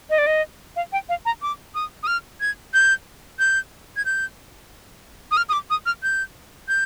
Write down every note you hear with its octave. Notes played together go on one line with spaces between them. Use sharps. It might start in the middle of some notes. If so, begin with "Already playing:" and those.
D#5
D5
D#5
F5
G5
F5
A#5
D6
D#6
D#6
F6
G#6
G6
G6
G#6
G6
D#6
F6
D#6
D6
D#6
F6
G6
G6